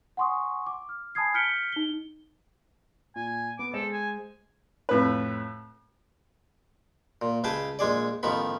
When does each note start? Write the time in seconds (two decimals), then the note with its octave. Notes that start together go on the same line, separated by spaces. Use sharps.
0.17 F#5 G#5 C6 C#6 D#6
0.67 D6
0.89 F6
1.15 G#5 A5 B5 D#6 G#6 C7
1.34 F6 G6 B6 C#7 D7 G7
1.73 D#4 G7
3.16 A#2 G#5
3.59 B3 D6
3.73 G#3 A4 C5 E7
3.93 G#5
4.89 F2 A2 B4
7.22 A#2
7.44 C#2 G#4 B4 G5 A5
7.79 A#1 G#3 G#4 D5
8.23 A1 D#3 F3 B3 B5